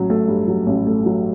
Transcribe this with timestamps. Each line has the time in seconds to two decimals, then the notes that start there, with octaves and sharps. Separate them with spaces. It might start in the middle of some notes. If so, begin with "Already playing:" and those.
Already playing: A1 F#3
0.10 A3
0.28 G2
0.48 F#3
0.67 A1
0.87 A3
1.06 F#3